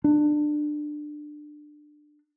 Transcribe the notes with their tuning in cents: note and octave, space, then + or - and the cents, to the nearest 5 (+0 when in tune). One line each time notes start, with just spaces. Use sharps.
D4 +20